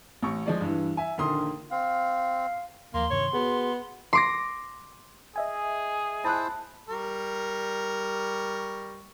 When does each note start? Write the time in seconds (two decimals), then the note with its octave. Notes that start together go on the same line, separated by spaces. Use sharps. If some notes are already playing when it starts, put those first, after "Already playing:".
0.22 A1 C#6
0.46 F3 G#3 D5
0.61 G2 E3
0.97 E5 G#5
1.18 A#1 D3 D#3 A#3 C6 D#6
1.71 C4 F5
2.94 D#2 F3 A#3 C6
3.10 G2 C3 D#3 C#5
3.33 B3 F#4 G#4
4.13 C6 D6 A#6
5.36 G#4 D#5 E5 G#5
6.24 E4 C5 A5 F#6
6.89 G3 A#4 C#6